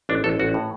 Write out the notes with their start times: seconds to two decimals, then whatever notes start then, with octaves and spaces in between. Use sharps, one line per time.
0.09 A1 D4
0.24 A1 A4
0.39 A1 F#4
0.54 A2